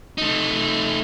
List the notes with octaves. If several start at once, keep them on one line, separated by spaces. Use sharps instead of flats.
A3 D#4